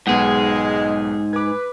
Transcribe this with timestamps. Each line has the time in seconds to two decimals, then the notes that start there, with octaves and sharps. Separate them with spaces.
0.07 B1 G#2 G#3 B3 G#4 F#5
1.33 B4 D6 G#6